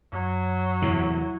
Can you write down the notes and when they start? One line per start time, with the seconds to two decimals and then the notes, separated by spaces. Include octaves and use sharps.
0.13 F#2 F#3
0.82 E2 A2 C3 E4